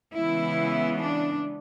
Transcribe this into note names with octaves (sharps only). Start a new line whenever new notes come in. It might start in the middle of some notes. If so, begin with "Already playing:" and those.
C#3 E3 G#3 B3 E4
D4